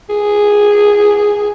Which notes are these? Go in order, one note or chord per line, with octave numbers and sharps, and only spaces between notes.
G#4